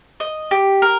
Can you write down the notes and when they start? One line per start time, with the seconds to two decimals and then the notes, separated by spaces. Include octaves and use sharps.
0.20 D#5
0.51 G4
0.82 A#4